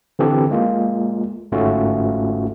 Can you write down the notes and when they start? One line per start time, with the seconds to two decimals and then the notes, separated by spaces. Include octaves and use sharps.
0.19 D3 E3 C4 G4 A4
0.51 G#3 A#3 F4
1.52 G1 G#2 A3 C#4 F4 F#4